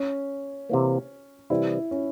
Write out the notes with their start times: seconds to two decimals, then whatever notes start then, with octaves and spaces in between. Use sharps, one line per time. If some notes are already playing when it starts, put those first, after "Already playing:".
Already playing: C#4
0.69 C3 E3 A#3
1.50 C3 E3 G3 E4
1.91 C#4